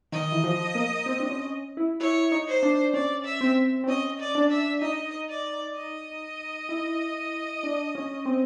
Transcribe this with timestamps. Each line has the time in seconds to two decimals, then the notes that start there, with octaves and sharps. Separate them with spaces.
0.12 D#3 D#5
0.32 E3
0.44 F3
0.75 A#3
1.06 C4
1.20 D4
1.29 C#4
1.77 E4
2.00 E4 C#5
2.32 D#4
2.47 C5
2.63 D4
2.94 C#4 D5
3.25 E5
3.41 C4
3.84 C4
3.88 C#4 D#5
4.20 D5
4.35 D4
4.50 E5
4.81 D#4 D#5
5.29 D5
5.75 D#5
6.69 E4
7.63 D4
7.95 C#4
8.25 C4